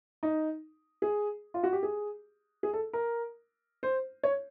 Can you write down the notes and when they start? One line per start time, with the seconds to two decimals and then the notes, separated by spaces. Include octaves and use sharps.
0.23 D#4
1.02 G#4
1.54 F4
1.63 F#4
1.73 G4
1.83 G#4
2.63 G#4
2.73 A4
2.93 A#4
3.83 C5
4.23 C#5